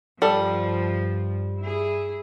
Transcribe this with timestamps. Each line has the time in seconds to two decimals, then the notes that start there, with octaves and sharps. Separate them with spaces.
0.22 G2 F3 G3 A4
1.60 E4 G#4